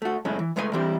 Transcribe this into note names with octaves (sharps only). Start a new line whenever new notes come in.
A3 F#4
F#2 C#3 G#3 A3 C#4 E4
E3
C#2 G#3 A3 B4 C5 G#5
E3 G3 C4 E4 G4